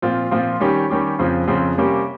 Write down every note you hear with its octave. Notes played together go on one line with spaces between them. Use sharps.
A#2 F3 C4 F4
A#2 F3 C4 F4
D#3 G3 C#4 G4
D#3 G3 C#4 G4
F2 C#3 F3 C4
F2 C#3 F3 C4
C3 G3 A#3 C#4 G4